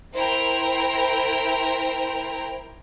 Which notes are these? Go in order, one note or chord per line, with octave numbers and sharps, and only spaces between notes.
E4 A#4 C5 G5 A#5